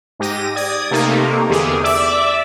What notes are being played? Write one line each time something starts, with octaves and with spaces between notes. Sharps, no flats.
G#2 G4 A#6 D#7
D5 D#6 G#6
C3 A3 A#3 D#4
E2 D3 G4 G#4
D5 E5 D6 E6